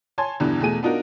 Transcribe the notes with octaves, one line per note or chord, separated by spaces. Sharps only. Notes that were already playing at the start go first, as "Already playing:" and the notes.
C#5 G#5 A5 C6 G#6
E2 G2 B2 D3 E3
E2 B2 A3 G#4 D#7
B3 D4 D#4 F4 F#4 A#4